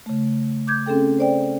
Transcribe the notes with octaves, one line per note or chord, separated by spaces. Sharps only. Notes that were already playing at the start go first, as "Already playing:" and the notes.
C#3 A3
D6 G6 G#6
C4 C#4 G#4 A4 G5
C5 D5 G5